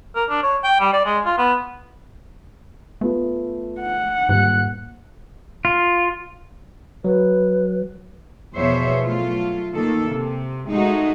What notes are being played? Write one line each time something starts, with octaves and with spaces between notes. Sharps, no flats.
A#4
D4
C#5
G5
G3
D5
G#3
F4
B3
A3 B3 F4
F#5
D#1 G#2 F#6
F4
F#3 B4
E2 B2 F3 C5 C#5 E5
F#3 A3 F4
D#3 A#3 A4
C3
G#3 A3 D#4 F#4